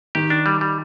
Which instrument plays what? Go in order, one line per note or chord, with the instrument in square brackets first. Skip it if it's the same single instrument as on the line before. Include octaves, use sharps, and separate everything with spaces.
[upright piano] D#3 [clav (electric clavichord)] G4
[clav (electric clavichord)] D4
G3
G3